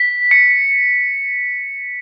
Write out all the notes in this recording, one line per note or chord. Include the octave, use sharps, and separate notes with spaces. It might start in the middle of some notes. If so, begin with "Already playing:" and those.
Already playing: B6
C#7